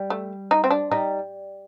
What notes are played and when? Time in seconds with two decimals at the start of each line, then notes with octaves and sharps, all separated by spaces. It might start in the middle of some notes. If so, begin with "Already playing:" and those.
Already playing: G3
0.10 A3
0.51 D#4
0.64 C4
0.71 D4
0.91 G3 D#4